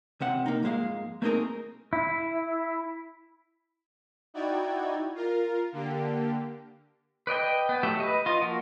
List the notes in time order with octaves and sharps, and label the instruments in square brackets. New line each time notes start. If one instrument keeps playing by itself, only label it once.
[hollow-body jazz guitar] C#2 C3 F#5
A#3 D#4
F2 G#2 G#3 A#3 F5
A3 A#3 C4 D#4 G#4 A#4
[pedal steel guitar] E4
[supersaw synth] D#4 E4 F#4 D5 G5 G#6
F4 A#4
D3 A#3 G4
[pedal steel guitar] B4 D5 D#5 G5
B3
F#3 A3 G4 E5
B4 D#5
F4 D#5
F3 A#3 F#4 A#4